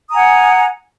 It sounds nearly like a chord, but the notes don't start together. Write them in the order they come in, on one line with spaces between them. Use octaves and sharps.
D#6 A#5 G#5 F#5